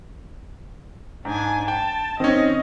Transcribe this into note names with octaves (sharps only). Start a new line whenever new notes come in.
G#2 D4 G#5
G5 A5
D#3 C4 C#4 D#5